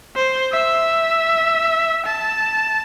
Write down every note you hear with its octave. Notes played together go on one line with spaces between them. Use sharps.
C5
E5
A5